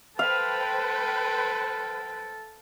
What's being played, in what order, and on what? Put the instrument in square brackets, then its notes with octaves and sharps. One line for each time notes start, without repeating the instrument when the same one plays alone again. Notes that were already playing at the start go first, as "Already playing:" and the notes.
[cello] A4 [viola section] B4 C5 G5 [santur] F5